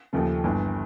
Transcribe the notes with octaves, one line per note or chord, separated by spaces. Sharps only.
D#2 C#3 F3 A3
G1 G2 E3